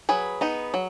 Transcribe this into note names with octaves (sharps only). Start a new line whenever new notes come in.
F#3 G#4 B4
B3 D#4
F#3